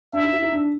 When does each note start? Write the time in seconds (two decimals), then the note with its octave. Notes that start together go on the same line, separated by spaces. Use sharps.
0.13 D4 E5
0.23 D#4
0.33 E4
0.42 D#4
0.52 D4